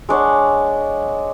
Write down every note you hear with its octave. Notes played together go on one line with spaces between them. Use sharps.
G#3 D4 C#5 F#5